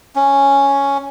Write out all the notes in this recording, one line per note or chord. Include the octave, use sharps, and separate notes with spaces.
C#4